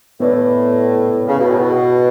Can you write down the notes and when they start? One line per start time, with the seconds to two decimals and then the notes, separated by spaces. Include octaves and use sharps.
0.20 A2 B3 E4 B4 D5
1.27 C#3
1.38 B2
1.48 A2
1.59 B2